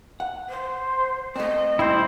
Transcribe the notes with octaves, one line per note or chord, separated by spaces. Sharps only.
F#5
C5
A3 C4 D#5
G2 C4 E4 C5 G5